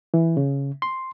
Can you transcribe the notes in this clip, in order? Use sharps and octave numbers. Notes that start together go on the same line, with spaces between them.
E3
C#3
C6